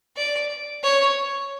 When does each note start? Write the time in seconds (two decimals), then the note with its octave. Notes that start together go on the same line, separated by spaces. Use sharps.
0.16 D5
0.83 C#5